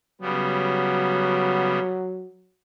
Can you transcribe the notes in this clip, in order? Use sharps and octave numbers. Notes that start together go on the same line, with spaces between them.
C#3 F#3 G3 B3